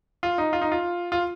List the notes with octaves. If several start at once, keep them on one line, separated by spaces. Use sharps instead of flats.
F4
D#4
F4
D#4
F4
F4